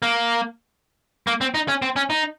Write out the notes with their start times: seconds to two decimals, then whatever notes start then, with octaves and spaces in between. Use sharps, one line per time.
0.02 A#3
1.27 A#3
1.41 C4
1.54 D#4
1.68 C#4
1.82 C4
1.96 C#4
2.10 D#4